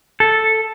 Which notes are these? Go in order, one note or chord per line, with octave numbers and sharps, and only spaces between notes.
A4